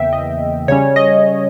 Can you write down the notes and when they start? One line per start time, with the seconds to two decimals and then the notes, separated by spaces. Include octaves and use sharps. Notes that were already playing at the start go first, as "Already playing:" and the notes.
Already playing: E2 C#3 E3 A#3 E5 G5
0.13 D#5
0.68 C#3 G3 C#4 C#5
0.96 D#5